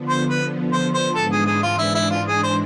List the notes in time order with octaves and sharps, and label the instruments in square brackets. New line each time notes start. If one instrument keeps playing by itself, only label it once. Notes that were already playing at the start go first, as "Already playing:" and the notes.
Already playing: [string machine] D3 F3 B3
[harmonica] C5
B4
C5
C5
[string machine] G#2 E3 G#3 D4 [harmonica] A4
[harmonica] G#4
G#4
F4
E4
E4
F4
G#4
C5